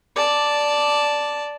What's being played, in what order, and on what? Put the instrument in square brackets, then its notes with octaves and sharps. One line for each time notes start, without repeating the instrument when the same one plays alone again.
[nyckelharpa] D5 A5